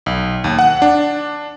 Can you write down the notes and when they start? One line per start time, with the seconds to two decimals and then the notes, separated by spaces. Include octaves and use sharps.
0.06 B1
0.44 D#2
0.59 F#5
0.82 D4